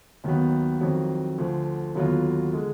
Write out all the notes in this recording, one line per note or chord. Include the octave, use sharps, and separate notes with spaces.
D#2 D#3 F#3 B3
F2 D#3 F#3
D2 D3 F3
D#2 D3 F#3 B3 F4
D3 G#3